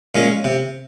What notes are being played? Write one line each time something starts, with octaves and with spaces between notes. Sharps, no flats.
A#2 G#3 C#4
C3